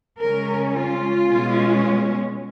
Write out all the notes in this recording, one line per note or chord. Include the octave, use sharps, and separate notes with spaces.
C#3 G#3 C#4 A#4
F4
B2 G#3 C#4